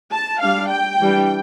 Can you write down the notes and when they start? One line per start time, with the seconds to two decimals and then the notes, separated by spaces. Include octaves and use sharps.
0.13 A5
0.42 G3 D4 F5
0.70 G5
1.00 E3 G3 D4